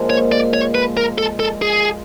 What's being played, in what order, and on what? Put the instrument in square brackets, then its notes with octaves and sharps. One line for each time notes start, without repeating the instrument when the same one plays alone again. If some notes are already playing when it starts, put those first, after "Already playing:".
Already playing: [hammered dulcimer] A#2 F3 G#3
[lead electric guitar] C#5
D5
C#5
B4
A#4
A4
A4
G#4